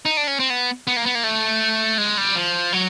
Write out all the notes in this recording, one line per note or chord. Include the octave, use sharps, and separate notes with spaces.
D#4
D4
C#4
C4
B3
B3
A#3
B3
A#3
A3
G#3
G3
F3
F#3